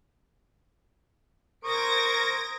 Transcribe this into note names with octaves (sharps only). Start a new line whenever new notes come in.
A#4 C5 C#6 D#6 G#6 A#6 D7